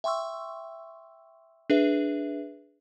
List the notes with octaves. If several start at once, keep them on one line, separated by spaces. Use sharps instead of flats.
E5 G5 C6 C#6 E6
D4 G#4 B4 E5